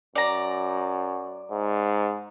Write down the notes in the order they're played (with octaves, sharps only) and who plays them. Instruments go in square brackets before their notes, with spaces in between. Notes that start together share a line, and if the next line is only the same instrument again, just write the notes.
[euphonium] F#2 [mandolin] D5 A#5
[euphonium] G#2